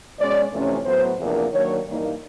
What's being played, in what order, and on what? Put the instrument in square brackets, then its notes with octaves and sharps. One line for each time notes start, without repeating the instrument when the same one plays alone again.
[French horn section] B2 G#3 C#4 D5
F2 C3 E3 A3 C#4
A2 F#3 B3 C5
E2 C3 F3 A#3 D4
D#3 F#3 A#3 D4 C#5
G2 E3 G3 A#3 D#4